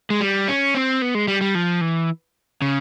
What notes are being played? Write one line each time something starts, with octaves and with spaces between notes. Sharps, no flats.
G#3
G3
C#4
C4
B3
G#3
G3
G3
F3
E3
C#3